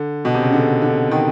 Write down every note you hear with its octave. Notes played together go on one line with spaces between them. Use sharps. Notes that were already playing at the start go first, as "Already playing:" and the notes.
Already playing: D3
B2
C3
C#3
D3
D3
D#3